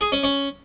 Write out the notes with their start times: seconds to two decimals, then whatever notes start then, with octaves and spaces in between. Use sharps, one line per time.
0.01 G#4
0.12 C#4
0.23 C#4